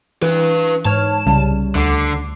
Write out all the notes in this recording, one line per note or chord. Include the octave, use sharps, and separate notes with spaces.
E3 D4 B4
G#2 C#5 A5 F6
C2 C#3 G3
D2 D3 D6 C7